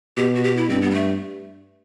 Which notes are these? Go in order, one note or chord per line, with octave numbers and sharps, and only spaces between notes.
B2 G4
F#4
G4
E4
G2 C4
B3
G3
A3